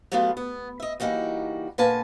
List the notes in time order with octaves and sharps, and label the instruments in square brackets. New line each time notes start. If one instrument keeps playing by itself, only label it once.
[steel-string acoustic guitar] F#3 G3 A3 B3 F4
B3
D#5 E5
E3 G3 A#3 D#4 F#4
A#2 D3 A#3 B4 G#5 A5